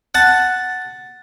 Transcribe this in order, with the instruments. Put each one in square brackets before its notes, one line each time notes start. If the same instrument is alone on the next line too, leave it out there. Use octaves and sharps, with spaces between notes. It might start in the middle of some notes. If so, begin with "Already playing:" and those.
[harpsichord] F#5 A5